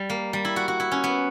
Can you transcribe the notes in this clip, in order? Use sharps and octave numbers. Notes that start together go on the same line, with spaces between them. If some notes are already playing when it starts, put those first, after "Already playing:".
Already playing: G3
A#3
G3
E4
F#4
F#4
E4
C#4
B3